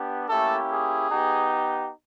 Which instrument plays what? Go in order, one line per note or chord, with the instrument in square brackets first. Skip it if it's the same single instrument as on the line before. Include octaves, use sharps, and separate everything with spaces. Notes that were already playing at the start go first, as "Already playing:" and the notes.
Already playing: [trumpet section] B3 D4 G4
A3 A#3 C#4 E4 G4 A4
G#4
B3 D#4 G4